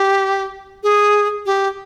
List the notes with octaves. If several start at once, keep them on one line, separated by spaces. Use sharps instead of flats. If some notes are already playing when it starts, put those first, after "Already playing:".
Already playing: G4
G#4
G4